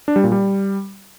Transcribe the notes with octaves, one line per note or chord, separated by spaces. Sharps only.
D4
G3
A#2
G3